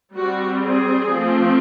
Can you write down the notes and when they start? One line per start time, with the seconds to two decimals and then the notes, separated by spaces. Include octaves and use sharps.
0.14 G3 C4 F#4
0.60 G#4
1.08 F3 A3 C4